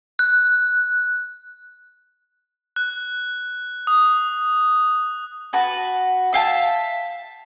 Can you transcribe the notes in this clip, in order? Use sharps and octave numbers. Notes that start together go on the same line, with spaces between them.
F#6
F#6
D#6
F#4 B4 A5
E5 F5 G5 A5